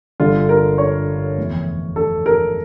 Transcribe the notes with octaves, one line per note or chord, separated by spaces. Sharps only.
G1 G2 D3 F4
A#4
C#5
F1 E2 E3
A4
A#4